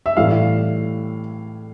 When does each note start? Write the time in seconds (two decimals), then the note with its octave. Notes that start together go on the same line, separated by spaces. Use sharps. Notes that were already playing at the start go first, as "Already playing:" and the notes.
0.06 E5
0.17 A2 E3 G3 F5